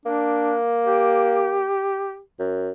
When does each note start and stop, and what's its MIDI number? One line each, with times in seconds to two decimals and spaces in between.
0.06 1.64 58
0.06 0.56 62
0.86 2.20 67
2.39 2.71 42